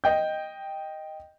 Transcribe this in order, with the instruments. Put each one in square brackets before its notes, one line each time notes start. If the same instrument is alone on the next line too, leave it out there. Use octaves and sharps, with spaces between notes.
[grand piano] D#5 G5 G6